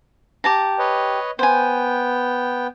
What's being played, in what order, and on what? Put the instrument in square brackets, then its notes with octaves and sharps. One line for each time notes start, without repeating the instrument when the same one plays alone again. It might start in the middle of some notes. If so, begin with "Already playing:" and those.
[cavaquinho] G4 A5 A#5
[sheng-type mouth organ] B4 C#5 D#5
[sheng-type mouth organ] B3 G5 [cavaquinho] C5 G#5